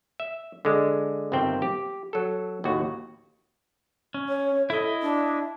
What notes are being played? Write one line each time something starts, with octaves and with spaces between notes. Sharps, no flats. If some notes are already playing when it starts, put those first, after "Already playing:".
E5
D3 G#3
G1 C3 D#3 C4 G5
G4
F#3 A4
D#2 A2 F#4
C#4
C#5
E4 A4 D#5
D4